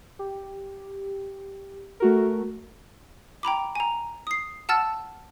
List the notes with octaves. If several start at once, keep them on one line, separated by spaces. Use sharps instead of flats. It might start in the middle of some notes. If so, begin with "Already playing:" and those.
G4
A3 F#4 A#4
G5 A#5 B5 D6
G#5 A#5
D#6 C7
F#5 A5 E6 F6 A6